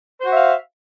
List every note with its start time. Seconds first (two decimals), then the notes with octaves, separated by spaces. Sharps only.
0.21 C5
0.25 F#4
0.30 E5
0.34 F5